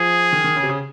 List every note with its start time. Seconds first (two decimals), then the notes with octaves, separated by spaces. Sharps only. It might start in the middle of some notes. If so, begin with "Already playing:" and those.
Already playing: F3 G#4
0.32 D#3
0.44 D#3
0.56 C#3
0.63 C3
0.69 C#3